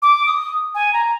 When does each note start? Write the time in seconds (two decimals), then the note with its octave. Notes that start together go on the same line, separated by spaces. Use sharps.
0.02 D6
0.26 D#6
0.75 G#5
0.93 A#5